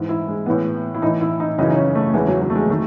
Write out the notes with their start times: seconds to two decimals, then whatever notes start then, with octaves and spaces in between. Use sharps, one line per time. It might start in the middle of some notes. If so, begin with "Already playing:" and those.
Already playing: G#2 E3
0.09 E4
0.28 G#3
0.46 A2 E3 B3
0.95 E4
1.02 A2 E3 D#4
1.21 E4
1.40 D#4
1.58 F#2 C#3 E3 D#4
1.70 D#4
1.76 C#4
1.95 A3
2.14 E2 C#3 E3 G#3
2.28 F#3
2.41 F#3
2.50 A3
2.56 G#3
2.70 D#3 A3